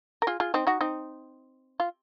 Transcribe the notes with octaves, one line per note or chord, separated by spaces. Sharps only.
A#4
F4 G#4
F4 G#4
C4 D#4
D#4 F#4
C4 D#4
F4